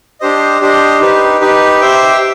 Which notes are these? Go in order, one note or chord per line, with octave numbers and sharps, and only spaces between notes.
D4 G4 C5 D#5
D4 G4 C5 D#5
D#4 G4 B4
D#4 G4 B4
G4 C5 E5 G5